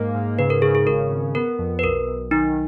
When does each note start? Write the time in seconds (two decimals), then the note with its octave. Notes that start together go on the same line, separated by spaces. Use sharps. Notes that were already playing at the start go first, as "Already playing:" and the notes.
Already playing: G#2 A#3
0.15 G#2
0.39 C#3 B4
0.50 A#4
0.62 C#3 G#4
0.75 G#4
0.86 G#1 A#4
1.11 G#1
1.35 B3 A#4
1.59 F2
1.79 B4
1.83 B1 A#4
2.08 B1
2.31 D#3 D#4